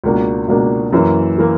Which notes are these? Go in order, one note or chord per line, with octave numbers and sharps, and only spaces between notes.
C#2 B2 A#3 D4 F#4
C#2 B2 A#3 D4 F#4
F#2 E3 A#3
E3 A#3